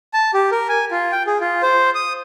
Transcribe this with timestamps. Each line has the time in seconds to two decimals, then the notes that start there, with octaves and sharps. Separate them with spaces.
0.14 A5
0.34 G4
0.52 A#4
0.69 G#5
0.91 F4
1.12 G5
1.27 G#4
1.41 F4
1.63 C5
1.95 D#6